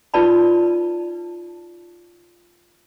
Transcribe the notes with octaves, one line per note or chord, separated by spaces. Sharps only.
D#4 F4 B4 D5 A5 B5